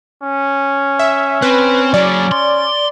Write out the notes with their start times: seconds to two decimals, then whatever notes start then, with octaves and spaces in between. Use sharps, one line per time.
0.23 C#4
0.99 E5
1.42 C4 B4
1.94 F#3 G#4 D5
2.32 C6